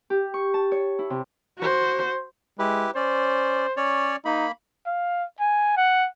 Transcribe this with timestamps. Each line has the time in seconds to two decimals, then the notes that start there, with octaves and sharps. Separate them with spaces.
0.10 G4
0.34 C#6
0.54 A5
0.72 C#5
0.99 E4
1.10 C3
1.58 F#4 C5
2.59 G#3 E4 G4 B4
2.95 C#4 C5 D5
3.77 C#4 C#5 D5
4.25 A#3 D#4 B5
4.86 F5
5.40 G#5
5.77 F#5